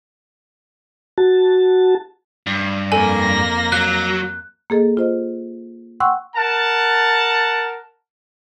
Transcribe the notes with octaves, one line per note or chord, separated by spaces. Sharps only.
F#4 A5
G2
F2 A#3 A4 G#5 A#6
F#3 F#6
A#3 G#4 A4 D#5
F4 C5 D#5
F#5 G5 C6 C#6 E6 F#6
A#4 F#5 A5